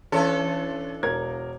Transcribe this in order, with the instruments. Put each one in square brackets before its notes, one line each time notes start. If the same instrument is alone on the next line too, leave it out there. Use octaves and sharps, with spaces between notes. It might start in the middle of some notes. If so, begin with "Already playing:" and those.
[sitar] E3 D4 A4 [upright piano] C#4
[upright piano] E1 A#4 G#6